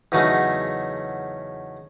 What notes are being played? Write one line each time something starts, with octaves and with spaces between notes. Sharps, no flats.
E2 C#3 F#3 A3 D#4